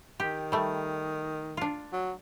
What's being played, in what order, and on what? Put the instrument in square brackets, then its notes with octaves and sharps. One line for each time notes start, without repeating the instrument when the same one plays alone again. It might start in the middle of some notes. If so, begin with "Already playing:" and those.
[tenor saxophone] D#3 [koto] G4
[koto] G3 A3
D4 F4
[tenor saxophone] F#3